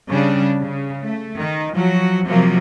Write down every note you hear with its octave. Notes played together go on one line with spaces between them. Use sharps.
C#3 G3 D4
C#3
A3
D#3
F3 F#3 F#4
C3 F3 F#3 A#3